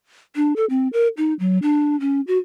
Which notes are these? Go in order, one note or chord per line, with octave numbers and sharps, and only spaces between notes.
D4
A4
C4
A#4
D#4
F#3
D4
C#4
F#4